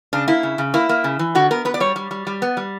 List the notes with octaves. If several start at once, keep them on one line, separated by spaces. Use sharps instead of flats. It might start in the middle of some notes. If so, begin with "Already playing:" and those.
C#3 D4
A#3 E4
C#3
C#3
A#3 E4
A#3
C#3
E3
D3 F#4
B3 A#4
B3 B4
D5
G3 C#5
G3
G3
G3
B3
G3